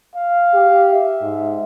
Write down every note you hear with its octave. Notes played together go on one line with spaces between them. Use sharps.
F5
G4
E5
G#2